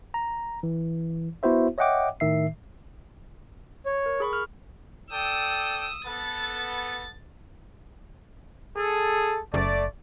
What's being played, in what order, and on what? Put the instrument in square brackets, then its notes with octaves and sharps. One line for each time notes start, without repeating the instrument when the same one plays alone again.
[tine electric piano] A#5
E3
B3 E4 F#4 C5 E5
C#5 D#5 E5 F#5 G5 D6
A2 D#3 E5 C7
[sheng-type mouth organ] C#5
[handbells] A#4
G#4 B5 C#6
F6
[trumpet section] A4 D5 G5 [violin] D#6 E6
[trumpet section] B3 A4 [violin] A6
[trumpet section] G#4 A4
[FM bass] F#1 [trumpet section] A3 D5